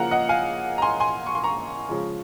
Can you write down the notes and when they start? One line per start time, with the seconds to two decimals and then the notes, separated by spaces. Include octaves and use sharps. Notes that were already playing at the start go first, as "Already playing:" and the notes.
Already playing: C#3 F3 A#3 F5 F#5 A#5
0.11 D#5 F#5
0.29 F5 G#5
0.78 A#5
0.82 G#5 C6
1.00 G#5 C6
1.26 C#6
1.35 C6
1.44 A#5 C#6
1.88 C#3 F3 G#3